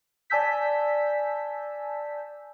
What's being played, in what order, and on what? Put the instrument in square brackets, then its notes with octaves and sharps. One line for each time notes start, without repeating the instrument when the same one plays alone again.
[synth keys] D5 G#5 A5 E6 G6 B6